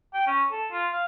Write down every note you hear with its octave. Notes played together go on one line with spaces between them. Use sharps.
G5
C#4
A4
F4
F5